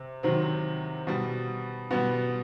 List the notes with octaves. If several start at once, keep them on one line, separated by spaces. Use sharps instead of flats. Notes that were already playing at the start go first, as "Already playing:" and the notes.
Already playing: C3
C3 D#3 F#3 C4
B2 G3
B2 G3 B3